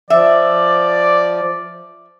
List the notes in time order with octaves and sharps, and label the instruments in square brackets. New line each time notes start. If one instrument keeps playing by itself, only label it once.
[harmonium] F3 [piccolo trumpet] D5 [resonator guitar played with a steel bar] E5